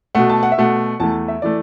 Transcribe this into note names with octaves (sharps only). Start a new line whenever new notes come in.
B2 A3 F#5
A5
F#5
E5
B2 A3 F#5
E2 E3 A3 A5
E5
E3 A3 D5